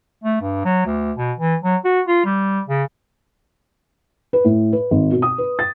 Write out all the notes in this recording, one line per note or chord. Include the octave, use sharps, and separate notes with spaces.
A3
G2
F#3
D2
B2
E3
F#3
F#4
F4
G3
C#3
B4
A2
B4
G#1
B2
D#6
B4
A6